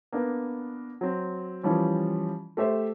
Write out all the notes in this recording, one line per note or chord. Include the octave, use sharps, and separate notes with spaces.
A#3 B3 D4
F#3 C4
E3 F3 G3 C#4
A3 G4 C5 E5